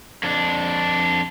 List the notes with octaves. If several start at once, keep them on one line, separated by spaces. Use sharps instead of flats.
F2 D4